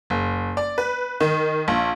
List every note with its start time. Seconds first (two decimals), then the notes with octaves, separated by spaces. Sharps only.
0.10 F#1
0.57 D5
0.78 B4
1.20 D#3
1.68 A#1